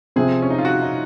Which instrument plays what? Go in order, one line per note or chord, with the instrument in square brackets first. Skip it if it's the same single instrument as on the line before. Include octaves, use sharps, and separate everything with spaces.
[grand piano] C3 F3 C4 [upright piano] G#4
[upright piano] C#4
D#4
F4
F#4
D#4